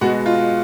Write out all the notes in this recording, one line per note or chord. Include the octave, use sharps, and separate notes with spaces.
B2 G#3 B3 F#4
F4